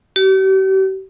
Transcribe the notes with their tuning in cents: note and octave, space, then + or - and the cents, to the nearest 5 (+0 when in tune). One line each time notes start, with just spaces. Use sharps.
G4 -40